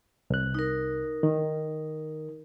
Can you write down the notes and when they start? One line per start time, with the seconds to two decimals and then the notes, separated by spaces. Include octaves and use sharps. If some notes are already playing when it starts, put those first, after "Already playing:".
0.30 C2 F#6
0.54 D#4 A#4
1.23 D#3